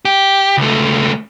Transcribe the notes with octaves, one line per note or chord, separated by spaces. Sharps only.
G4
C#2 A3